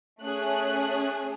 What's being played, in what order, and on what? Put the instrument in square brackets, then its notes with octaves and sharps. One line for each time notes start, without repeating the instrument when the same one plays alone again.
[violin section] A3 C#4 G#4 F#6